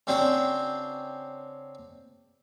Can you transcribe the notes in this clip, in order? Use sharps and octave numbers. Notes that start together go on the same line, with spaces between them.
C#3 C4 D4 F#4 G5